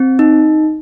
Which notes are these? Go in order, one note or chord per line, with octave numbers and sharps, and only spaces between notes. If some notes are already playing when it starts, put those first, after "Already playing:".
Already playing: C4
D#4